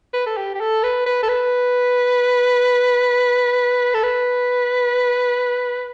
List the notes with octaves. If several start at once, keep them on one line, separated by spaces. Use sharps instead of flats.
B4
A4
G4
G4
A4
B4
B4
A4
B4
A4
B4